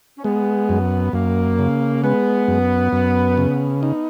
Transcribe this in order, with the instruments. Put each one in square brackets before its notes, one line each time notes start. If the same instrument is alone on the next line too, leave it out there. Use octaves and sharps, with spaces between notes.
[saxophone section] C#4
[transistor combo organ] G#3 [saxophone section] B3
[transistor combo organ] F#2
[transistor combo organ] F#2 [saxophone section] A#3
[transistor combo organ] C#3
[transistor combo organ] G#3 [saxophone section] B3
[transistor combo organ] F#2
F#2
C#3
[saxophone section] B3 [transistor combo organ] D#4